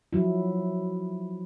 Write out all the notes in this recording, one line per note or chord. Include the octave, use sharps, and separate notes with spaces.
F3 F#3 E4